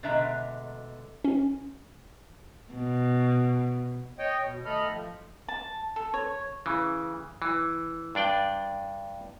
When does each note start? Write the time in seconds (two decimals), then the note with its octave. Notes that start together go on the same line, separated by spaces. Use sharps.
0.03 B2 D3 G#3 D4 E5 A#5
1.24 C#4
2.74 B2
4.19 C#5 D#5 G5
4.43 B2
4.66 D#3 A3 A4 D#5 B5 F6
4.89 F3
5.48 A5
5.96 A4
6.14 C#5
6.66 C#3 E3
7.42 E3
8.15 G2 D4 D5 G5